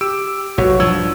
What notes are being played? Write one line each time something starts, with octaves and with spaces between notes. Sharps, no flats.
G4 E6 D7
B1 F#4 C#5 C#6
G2 F3 E6 G#6